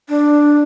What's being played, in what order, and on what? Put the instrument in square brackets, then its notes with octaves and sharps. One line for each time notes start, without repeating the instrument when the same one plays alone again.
[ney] D4